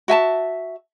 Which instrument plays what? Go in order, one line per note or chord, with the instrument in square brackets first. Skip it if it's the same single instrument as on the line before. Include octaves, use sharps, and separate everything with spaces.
[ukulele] F#4 E5 G#5 A5